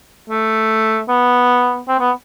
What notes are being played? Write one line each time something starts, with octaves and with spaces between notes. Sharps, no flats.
A3
B3
C4
B3